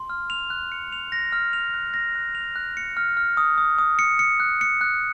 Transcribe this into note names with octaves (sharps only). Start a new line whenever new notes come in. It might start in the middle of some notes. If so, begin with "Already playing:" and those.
Already playing: C6
F6
F7
F#6
C#7
F7
A#6
F6
F7
F#6
A#6
F#6
F7
F#6
C#7
F6
F6
D#6
D#6
D#6
C#7
C#7
F#6
C#7
F#6